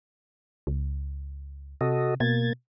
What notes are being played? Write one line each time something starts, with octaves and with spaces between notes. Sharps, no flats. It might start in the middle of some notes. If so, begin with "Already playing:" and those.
C#2
C3 F#4 A4 D#5
B2 A#3 G#6 A6